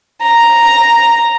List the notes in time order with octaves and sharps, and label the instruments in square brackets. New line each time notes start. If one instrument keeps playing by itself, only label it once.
[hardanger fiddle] A#5